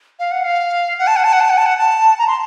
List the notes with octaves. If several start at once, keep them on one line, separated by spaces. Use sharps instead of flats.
F5
F#5
F5
F#5
A5
F#5
A5
F#5
A5
F#5
A5
F#5
A5
A#5
C6